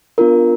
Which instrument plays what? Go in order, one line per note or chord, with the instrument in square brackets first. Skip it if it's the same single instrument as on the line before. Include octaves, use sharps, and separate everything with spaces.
[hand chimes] B3 D4 F4 A#4